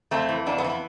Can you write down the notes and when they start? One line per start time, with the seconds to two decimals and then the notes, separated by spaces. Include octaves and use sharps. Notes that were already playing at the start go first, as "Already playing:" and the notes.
0.11 F2 A3 C4
0.29 E3
0.46 F2 B3 D4
0.58 B3
0.64 E3 C4
0.70 B3